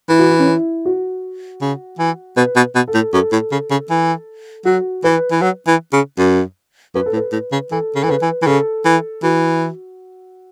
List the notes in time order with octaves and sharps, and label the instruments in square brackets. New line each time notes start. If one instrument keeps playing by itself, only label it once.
[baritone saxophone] E3 [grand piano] E4
[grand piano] F#4
E4
C#4
E4
F#4
[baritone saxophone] C#3
E3
[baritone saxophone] B2 [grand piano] B4
[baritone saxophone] B2
B2
[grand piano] A4
[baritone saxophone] A2
[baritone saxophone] F#2 [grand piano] A4
[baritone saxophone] A2
C#3
C#3
E3
[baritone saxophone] F#3 [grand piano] F#4
[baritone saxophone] E3 [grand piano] B4
[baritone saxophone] E3
F#3
E3
C#3
F#2
[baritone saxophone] F#2 [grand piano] B4
[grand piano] A4
[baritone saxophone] A2
[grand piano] B4
[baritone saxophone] A2
C#3
[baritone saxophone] E3 [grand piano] A4
[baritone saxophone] C#3
[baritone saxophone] E3 [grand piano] A4
[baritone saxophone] C#3 [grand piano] B4
[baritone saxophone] E3
E3
[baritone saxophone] C#3 [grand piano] A4
[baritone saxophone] E3
[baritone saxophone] E3 [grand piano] F#4